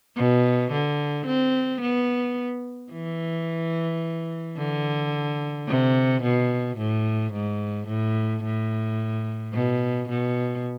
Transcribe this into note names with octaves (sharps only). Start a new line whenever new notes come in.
B2
D3
C4
B3
E3
D3
C3
B2
A2
G#2
A2
A2
B2
B2